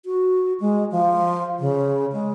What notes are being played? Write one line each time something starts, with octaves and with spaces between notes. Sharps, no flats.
F#4
G#3
F3
C#3
G#3